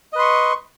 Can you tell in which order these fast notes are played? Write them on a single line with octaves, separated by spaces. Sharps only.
D#5 B4 C6 C#6